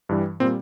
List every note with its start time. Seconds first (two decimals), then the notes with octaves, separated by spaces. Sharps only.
0.09 G2 E3 G3
0.40 A#2 G3 C4